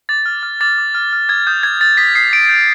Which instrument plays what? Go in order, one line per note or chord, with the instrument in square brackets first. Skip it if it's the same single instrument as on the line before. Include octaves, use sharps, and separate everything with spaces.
[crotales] D6 A6
F6
F6
D6 A6
D6
F6
F6
D#6 G#6
D#6 G6
G6 G#6
G6 A6
D#6 B6
D#6 C7
G6 D7
G6